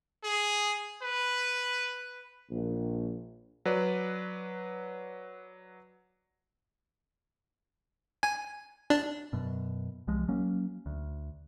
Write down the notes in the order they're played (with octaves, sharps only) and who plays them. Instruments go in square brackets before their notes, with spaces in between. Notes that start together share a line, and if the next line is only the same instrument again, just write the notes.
[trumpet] G#4
B4
[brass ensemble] A#1
[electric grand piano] F#3 B4 D5
[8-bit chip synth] G#5
D4
[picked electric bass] F#2 B2
C2 F3 G#3
F#3 A#3 C#4
D2